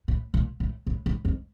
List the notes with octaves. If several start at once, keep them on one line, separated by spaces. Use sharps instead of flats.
A2
A#2
A2
A2
A2
F2